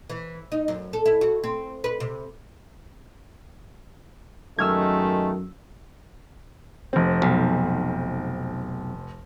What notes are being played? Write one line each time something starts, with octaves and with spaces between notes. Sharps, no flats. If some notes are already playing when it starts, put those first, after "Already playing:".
E3
D#4
F#2
A4
E4
F#4
C4
B4
C3
F#2 D#3 G#3 A3 E6 F6 G#6
F1 C4
B1